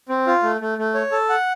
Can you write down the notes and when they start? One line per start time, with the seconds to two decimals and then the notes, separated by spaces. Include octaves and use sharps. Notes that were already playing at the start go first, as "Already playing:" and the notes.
0.09 C4
0.27 F4
0.43 A3
0.61 A3
0.78 A3
0.94 C#5
1.12 A4
1.29 F#5